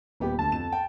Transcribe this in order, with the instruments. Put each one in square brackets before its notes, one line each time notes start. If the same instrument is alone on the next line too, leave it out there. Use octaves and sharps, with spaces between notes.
[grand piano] D#1 B3 G4
[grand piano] D2 [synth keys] A5
[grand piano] F2 E7
G5